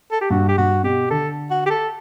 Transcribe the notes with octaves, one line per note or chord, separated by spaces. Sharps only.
A4
G4
G2 F#4
G4
G2 F#4
B2 G4
D3 A4
F#4
G4
A4